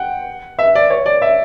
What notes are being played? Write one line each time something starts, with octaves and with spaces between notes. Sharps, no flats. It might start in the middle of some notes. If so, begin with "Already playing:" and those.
Already playing: F#5 G5
E5
D5
C#5
D5
E5